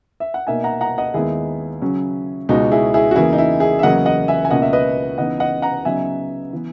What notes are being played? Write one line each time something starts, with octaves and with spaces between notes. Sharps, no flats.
E5
F#5
B2 A#3 D#4 E5 G#5
F#5 A#5
F#5 A#5
D#5 F#5
D#2 D#3 G#3 B3 D#4 E4 G#4
C#3 F#3 C#4
C#2 B2 G#3 D#4 F#4
E4 G#4
E4 G#4
F#4
E2 C#3 E3 A#3 E4 G#4
D#4
E4
E4 G#4
E5
E2 C#3 F#3 A#3 D#5 F#5
D#5 F#5
E5 G#5
G#5
C#2 B2 A#3 C#4 D#5 F#5
E5
B4 D#5
C#3 E3 B3 D#4 D#5 F#5
D#5 F#5
F#5 A#5
C#3 F#3 B3 D#4 E5 G#5
E3 B3